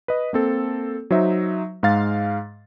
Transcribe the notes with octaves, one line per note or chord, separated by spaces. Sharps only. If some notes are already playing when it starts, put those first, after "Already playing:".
B4 D#5
A#3 C4 A4
F#3 D#4 C5 E5
G#2 G#3 F5 A6